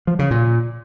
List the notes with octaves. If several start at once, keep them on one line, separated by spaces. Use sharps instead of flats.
F3
C#3
A#2